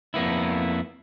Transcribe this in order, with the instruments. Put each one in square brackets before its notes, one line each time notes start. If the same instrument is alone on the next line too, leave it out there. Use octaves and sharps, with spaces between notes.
[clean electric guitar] F2 A#3 B3 E4